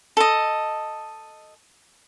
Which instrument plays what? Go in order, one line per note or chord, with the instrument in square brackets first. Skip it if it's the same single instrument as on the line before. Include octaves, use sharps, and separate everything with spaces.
[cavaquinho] A4 D#5